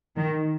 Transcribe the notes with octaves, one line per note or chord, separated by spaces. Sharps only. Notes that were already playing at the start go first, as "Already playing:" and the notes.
D#3